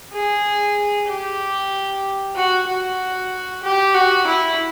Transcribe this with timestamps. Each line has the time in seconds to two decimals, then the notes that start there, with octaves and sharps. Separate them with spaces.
0.13 G#4
1.08 G4
2.36 F#4
2.67 F#4
3.63 G4
3.94 F#4
4.27 E4